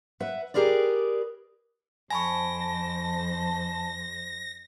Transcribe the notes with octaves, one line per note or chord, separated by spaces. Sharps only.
B4 E5 F#5
G4 G#4 A#4 B4 D5
F2 C5 G#5 A5 B5 C#6 A#6